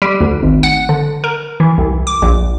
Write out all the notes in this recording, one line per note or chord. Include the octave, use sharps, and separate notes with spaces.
G3
D2
G#1
F#5
D3
A#4
E3
C2
D6
A#1